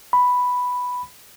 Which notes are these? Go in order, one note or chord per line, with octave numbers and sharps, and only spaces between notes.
B5